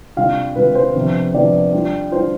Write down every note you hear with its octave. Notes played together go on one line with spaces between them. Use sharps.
C3 G3 D4 F4 F5
C3 G3 D4 F4 B4
C5
C3 F3 B3 D4
C3 F3 B3 D4 D5
G3 D4 F4
G3 D4 F4 C5